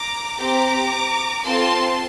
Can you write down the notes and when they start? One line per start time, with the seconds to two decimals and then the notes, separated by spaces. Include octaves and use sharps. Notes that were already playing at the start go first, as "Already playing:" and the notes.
Already playing: A#5 D6
0.38 C4 G4 A#5 D6
1.45 C4 F4 A4 A5 C6